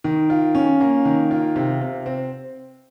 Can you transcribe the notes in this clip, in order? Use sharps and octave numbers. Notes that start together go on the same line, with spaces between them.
D#3
F4
C#4
A#3
D#3
F4
C3
C3
C4